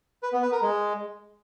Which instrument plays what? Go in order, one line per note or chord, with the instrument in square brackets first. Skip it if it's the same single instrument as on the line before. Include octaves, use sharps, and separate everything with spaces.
[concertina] B4
B3
B4
A#4
G#3